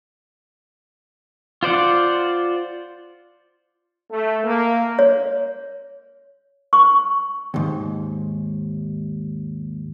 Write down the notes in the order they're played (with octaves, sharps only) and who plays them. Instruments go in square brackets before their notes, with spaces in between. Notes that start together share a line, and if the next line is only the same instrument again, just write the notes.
[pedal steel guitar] F4 C5 D5 F#5
[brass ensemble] A3
A#3
[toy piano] C#5
C#6
[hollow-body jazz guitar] D#2 G#2